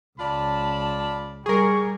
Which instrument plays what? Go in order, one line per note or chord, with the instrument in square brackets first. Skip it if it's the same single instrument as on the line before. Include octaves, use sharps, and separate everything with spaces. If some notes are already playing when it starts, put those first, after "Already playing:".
[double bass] C#2 [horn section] F4 D5 B5 [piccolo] A5
[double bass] G3 [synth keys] G#4 A#4 [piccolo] C#6